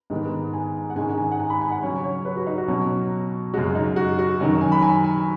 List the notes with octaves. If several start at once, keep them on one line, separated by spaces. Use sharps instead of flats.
G#2 D#3 G#3 B3
G#5
F#5
G#2 D#3 G#3 C#4 G#5
G#5
F#5
G#5
B5
G#5
F#5
C#3 F#3 C#4 C#5
C#5
B4
F#4
D#4
F#4
B2 F#3 C#4
F#2 C#3 G#3 F#4
D#4
F#4
F#4
F#2 D#3 F#3 C#4 D#4
G#5
B5
G#5
G#5